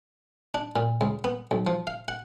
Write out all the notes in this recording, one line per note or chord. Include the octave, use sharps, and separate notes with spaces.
D4
A#2
C#2
B3
B1
F3
F5
F#5